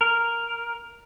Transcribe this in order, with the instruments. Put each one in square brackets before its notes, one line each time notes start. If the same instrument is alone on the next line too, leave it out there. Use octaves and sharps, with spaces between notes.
[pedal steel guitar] A#4